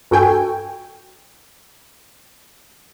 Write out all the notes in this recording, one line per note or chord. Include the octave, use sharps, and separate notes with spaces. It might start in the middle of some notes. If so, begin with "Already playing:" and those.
G2 F#4 A4 G5 G#5